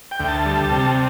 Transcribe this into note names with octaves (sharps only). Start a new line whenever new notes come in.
G5
D2
A5
G3
C3